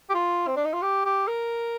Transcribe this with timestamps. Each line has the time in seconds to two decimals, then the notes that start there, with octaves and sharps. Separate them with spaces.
0.10 G4
0.14 F4
0.47 C4
0.56 D4
0.65 D#4
0.73 F4
0.82 G4
1.05 G4
1.27 A#4